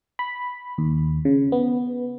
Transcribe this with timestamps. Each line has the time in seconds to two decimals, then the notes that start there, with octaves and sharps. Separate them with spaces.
0.19 B5
0.78 D#2
1.25 C#3
1.52 B3